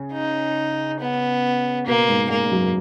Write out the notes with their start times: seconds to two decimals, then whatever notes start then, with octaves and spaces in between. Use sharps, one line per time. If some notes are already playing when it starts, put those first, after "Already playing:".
Already playing: C#3
0.13 D#4
1.00 B3
1.86 B2 A#3 B3
2.09 G#2 G#3
2.30 G#2 G#3 A#3
2.46 G#3
2.52 F#2 F#3